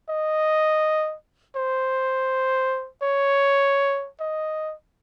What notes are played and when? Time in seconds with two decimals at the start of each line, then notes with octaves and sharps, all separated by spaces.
0.09 D#5
1.56 C5
3.02 C#5
4.20 D#5